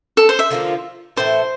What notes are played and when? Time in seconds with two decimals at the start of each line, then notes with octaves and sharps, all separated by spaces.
0.17 A4
0.29 C5
0.39 E5
0.50 D3 F3 A#3 F4
1.17 A2 E3 A3 C5